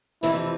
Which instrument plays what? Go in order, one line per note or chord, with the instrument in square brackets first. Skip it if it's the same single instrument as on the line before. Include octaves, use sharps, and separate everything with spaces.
[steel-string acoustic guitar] F2 C3 E3 A3 C4 [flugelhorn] E4